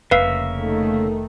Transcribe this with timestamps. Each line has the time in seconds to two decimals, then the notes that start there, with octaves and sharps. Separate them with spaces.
0.11 F1 C#3 A#3 B4 E5 F5
0.58 D#3 A3